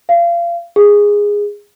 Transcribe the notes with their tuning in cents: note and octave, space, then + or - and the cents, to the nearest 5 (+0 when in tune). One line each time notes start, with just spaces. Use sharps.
F5 -30
G#4 -15